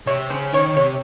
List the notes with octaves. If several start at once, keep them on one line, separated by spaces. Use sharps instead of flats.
C3 C#5
C#3 C5
D#3 C#5
C3 C#5